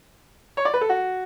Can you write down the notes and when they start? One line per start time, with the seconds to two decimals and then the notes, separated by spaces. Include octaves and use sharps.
0.57 C#5
0.65 D5
0.74 B4
0.81 A4
0.89 F#4